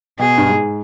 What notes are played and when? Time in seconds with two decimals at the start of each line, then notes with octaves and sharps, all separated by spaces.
0.19 B2 G#4
0.38 G2
0.49 G#2